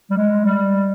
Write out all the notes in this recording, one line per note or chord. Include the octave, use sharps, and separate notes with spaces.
G3
G#3
G3